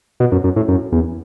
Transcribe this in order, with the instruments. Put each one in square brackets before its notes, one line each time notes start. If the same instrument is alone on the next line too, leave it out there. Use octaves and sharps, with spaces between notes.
[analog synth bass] B2
F#2
F#2
A2
F#2
E2